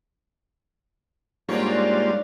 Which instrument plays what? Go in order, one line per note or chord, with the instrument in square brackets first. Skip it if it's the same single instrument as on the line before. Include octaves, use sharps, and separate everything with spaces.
[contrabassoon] G#2 [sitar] F#3 D4 C#5 [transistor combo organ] G3 A#3 F4